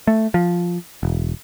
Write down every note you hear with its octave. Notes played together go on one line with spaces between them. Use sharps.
A3
F3
E1